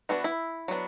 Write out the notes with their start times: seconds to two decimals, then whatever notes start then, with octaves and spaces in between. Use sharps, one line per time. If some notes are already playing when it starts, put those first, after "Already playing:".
0.09 E3 B3 D4 F#4
0.24 E4
0.68 F#3 B3 D4